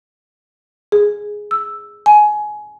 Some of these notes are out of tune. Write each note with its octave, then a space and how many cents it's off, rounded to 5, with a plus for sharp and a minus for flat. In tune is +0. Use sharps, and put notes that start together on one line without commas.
G#4 +0
E6 +0
G#5 +20